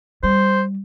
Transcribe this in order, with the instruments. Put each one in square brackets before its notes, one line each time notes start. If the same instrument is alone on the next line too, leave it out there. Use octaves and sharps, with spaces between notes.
[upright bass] G3 [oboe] C5